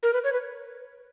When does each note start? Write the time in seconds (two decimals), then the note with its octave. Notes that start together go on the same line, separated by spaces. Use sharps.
0.03 A#4
0.13 B4
0.24 C#5
0.32 B4